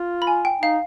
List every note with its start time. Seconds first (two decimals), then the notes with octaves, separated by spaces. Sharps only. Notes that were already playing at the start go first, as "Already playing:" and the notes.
Already playing: F4
0.22 B5
0.27 G#5
0.45 G5
0.62 D#4 F5